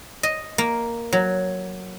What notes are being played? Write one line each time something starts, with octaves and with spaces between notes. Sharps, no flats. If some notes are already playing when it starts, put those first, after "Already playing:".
D#5
A#3
F#3